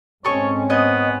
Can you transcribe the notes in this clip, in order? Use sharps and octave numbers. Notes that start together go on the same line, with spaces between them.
G#2 C4 C#4 A4 C#5 D#5 C#6
B3 C#5 D#5